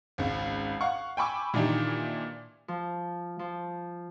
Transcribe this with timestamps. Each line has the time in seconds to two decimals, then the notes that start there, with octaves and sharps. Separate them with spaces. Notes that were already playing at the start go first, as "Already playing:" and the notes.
0.18 G#1 C#2
0.81 F5 F#5 C#6
1.17 G5 G#5 B5 C#6 D6 E6
1.54 A#2 D#3 E3 D4 D#4 G4
2.68 F3
3.39 F3